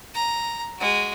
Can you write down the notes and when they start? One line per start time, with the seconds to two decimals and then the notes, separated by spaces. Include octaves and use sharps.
0.14 A#5
0.78 G#3 F#4